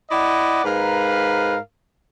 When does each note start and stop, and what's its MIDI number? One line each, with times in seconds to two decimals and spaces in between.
0.10 0.61 64
0.10 0.61 74
0.10 0.61 75
0.10 0.61 78
0.65 1.57 44
0.65 1.57 70
0.65 1.57 71
0.65 1.57 77